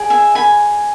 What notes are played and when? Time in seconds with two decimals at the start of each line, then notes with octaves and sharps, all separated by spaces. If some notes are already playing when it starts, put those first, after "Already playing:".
Already playing: G#4 D5
0.10 E5 G#5
0.35 G#5 B5